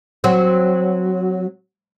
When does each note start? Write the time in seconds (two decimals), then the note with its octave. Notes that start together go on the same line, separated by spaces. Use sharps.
0.24 F#3 C4